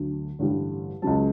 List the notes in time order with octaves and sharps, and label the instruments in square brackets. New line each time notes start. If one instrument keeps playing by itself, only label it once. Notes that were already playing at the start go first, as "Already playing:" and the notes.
Already playing: [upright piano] D2 D3 F#3
A1 G2 D3 G3
C#2 C#3 F#3 A5